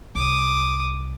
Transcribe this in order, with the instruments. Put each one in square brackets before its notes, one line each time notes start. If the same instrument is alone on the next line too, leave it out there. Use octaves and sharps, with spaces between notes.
[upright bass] C2 [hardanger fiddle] D6 D#6